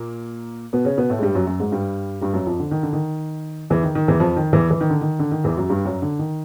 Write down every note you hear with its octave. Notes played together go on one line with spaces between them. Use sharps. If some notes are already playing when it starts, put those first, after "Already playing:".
Already playing: A#2 A#3
B2 B3
C#3 C#4
B2 B3
A2 A3
G#3
G2 G3
F#2 F#3
F#2 F#3
G#2 G#3
G2 G3
G2 G3
F#2 F#3
F2 F3
D3
D#3
D3
D#3
E2 E3
D#3
D#3
E2 E3
F2 F3
D#3
E2 E3
E3
D#3
D3
D#3
D3
D#3
E2 E3
F#2 F#3
G2 G3
F#2 F#3
D3
D#3